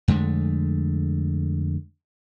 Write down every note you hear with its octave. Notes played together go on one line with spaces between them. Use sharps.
F2 D3 G#3 A3